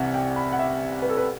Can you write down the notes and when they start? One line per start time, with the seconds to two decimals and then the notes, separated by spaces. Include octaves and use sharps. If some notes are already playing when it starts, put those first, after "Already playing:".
Already playing: C2 C3 E3 G3 E5 F#5
0.14 G5
0.36 B5
0.52 F#5
0.59 E5
1.02 B4
1.10 A4
1.17 B4